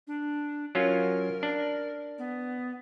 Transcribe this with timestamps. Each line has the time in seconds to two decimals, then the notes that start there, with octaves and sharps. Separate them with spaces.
0.07 D4
0.75 F#3 C#4 F4 A#4
1.43 D4
2.18 B3